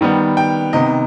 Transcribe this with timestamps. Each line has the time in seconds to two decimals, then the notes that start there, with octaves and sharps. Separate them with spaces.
0.01 D#3 G3 B3
0.37 G5
0.73 C3 D#3 B3 D#5